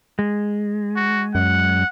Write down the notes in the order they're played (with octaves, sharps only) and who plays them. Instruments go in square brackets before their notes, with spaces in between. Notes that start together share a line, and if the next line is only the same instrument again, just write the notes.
[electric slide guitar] G#3
[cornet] F#4
[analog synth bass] F#2 [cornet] F#5